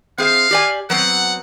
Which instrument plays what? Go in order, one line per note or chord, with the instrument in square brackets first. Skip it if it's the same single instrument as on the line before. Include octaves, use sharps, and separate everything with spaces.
[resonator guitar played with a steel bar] C4 G#4 E5 [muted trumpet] F5
[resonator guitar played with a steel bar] G4 D5 G#5
[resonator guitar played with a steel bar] F#3 B3 C4 [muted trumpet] F#5